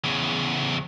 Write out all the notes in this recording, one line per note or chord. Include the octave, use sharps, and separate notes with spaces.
E2 C#3